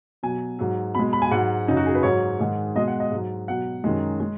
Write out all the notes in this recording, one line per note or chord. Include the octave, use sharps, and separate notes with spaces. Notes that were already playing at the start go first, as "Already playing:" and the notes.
B2 F#3 G#5
G#2 F#3
B2 G#3 B5
B5
G#5
G#2 F#3 F#5
F#2 C#3 F#3 D#4
F#4
G#4
B4
G#2 F#3 C#5
G#2 D#3 G#3
B2 G#3 D#5
F#5
D#5
G#2 F#3
B2 F#3 F#5
F#2 D#3 G#3
G#3